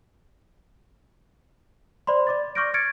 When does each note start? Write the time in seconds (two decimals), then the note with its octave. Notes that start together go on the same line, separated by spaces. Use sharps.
2.07 C5 D5 B5 C6
2.27 D5 D6 A6
2.55 C#6 D6 F6 G6 A#6 D7
2.74 F6 G#6 A6 C#7 D7